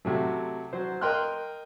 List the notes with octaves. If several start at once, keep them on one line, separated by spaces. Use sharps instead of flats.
C3 F#3 A3
F#3 C5
A#4 D#5 G5 C6 F6 F#6